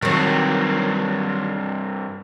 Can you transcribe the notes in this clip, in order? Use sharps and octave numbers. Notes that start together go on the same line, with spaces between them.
G2 D#3 F#3 C4